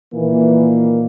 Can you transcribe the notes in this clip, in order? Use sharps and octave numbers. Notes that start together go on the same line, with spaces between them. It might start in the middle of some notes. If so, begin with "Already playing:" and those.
A#2 D#3 E3 A#3